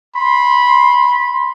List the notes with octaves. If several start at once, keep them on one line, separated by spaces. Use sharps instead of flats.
B5 C6